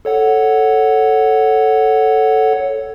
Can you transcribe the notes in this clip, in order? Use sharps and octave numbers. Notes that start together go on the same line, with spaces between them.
A4 C#5 F#5